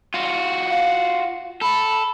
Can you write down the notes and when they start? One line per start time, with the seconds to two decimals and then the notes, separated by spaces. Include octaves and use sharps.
0.14 F4 F#4
0.70 F5
1.61 A4 B5